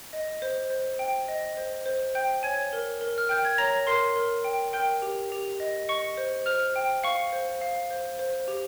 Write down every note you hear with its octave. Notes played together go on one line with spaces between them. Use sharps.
D#5
C5
C5
G5
D#5
C5
C5
G5 G6
C#5 G#5 G#6
A#4
A#4
F6
G5 G6
G#6
C#5 A#5 A#6
A#4 C6 C7
A#4
G5
A#4 G5 G6
G4
G4
D#5
D#5 C#6 C#7
C5
C5 F6 F7
G5
F5 C#6 C#7
C5
F5
C5
C5
G4